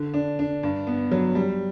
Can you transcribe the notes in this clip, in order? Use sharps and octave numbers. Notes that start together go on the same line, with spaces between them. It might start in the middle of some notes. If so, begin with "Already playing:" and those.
Already playing: D3
D4
D4
G2
B3
F#3
G3